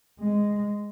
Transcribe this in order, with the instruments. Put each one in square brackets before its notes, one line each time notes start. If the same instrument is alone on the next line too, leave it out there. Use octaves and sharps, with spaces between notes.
[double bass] G#3